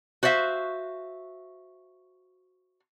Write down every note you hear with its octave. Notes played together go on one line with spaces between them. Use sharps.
F#4 C5 D5 E5 F5